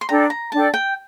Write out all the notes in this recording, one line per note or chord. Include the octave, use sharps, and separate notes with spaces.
C6
D4 A4 D5 G5 A#5
A#5
D4 A4 D5 G5 A5
G5